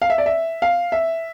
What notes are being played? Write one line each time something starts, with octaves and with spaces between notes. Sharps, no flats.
F5
E5
D5
E5
F5
E5